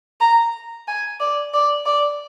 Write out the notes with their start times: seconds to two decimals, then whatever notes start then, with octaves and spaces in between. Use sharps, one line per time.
0.21 A#5
0.88 G#5
1.20 D5
1.54 D5
1.86 D5